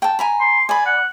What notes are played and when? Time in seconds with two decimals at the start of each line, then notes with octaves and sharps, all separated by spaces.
0.02 G5 A5
0.19 G#5 A#5 B5
0.40 C6
0.69 D5 G#5 B5
0.86 F#5